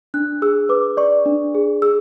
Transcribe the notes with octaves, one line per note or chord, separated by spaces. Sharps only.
D4 F#6
G#4 E6
B4 D6
D5 C#6
D4
G#4
G#4 E6